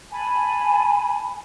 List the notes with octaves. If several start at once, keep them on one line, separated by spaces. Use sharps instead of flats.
G#5 A5 B5